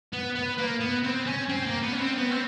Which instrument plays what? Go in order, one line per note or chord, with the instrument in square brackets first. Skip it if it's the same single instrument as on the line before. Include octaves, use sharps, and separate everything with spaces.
[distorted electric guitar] B3
B3
A#3
B3
C4
C#4
C4
A#3
B3
C#4
C4
B3
C4